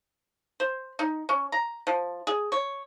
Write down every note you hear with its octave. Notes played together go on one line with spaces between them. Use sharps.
C5
D#4
C#4
A#5
F3
G#4
C#5